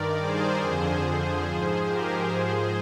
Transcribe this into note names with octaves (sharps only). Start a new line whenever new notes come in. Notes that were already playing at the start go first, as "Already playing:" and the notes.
Already playing: G2 D#3 A#4 D5
G#4 C5
F2 D3 F3
G#4 C5
G#2 F3
G4 A#4
G#2 F3 G#4 C5